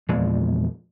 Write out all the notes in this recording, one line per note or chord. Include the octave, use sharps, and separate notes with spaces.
E2 A#2 F3 G#3